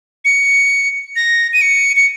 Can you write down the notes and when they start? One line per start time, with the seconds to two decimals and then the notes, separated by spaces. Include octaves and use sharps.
0.25 C#7
1.16 A#6
1.53 D#7
1.62 C#7
1.97 C#7